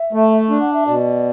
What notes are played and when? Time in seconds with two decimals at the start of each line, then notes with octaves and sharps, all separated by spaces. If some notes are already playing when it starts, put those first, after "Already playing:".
Already playing: E5
0.13 A3
0.50 D4
0.61 F#5
0.74 E5
0.87 B2 D5